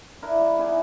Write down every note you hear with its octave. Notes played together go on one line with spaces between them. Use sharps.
D4 E4 A#4
G3 D5
B3 D#4 E4 G#4